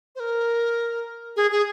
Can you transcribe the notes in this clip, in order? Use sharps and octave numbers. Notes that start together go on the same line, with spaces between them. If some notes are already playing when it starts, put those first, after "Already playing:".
C5
A#4
G#4
G#4